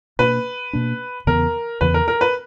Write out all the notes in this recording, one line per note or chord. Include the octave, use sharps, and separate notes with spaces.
B2 A#3 D4 B4
B2 A#3 D4
E2 C#3 E3 B3 A#4
E2 C#3 E3 B3 B4
A#4
A#4
B4